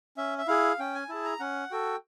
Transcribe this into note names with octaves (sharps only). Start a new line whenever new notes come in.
C#4 E5
E5
E4 G#4 F5
C#4 G5
G#5
E4 G#4 A5
A#5
C#4 F#5
F#4 A4 G5